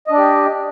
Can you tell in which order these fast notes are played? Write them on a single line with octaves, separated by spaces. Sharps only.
D#5 D4 D5 G4